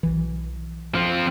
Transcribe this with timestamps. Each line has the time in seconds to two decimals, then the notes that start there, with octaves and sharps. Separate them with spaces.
0.03 B1 E3
0.95 F3 C4